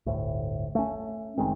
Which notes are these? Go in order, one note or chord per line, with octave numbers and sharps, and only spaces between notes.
G1 D2 A2
A3 C#4
F#1 D#3 G#3 C4